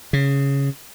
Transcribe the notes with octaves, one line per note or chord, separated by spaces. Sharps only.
C#3